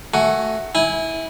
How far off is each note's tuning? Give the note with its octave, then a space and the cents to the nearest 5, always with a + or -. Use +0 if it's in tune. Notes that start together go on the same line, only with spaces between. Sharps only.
A3 +0 F#4 +15 G#5 +10
E4 -20 G#5 +0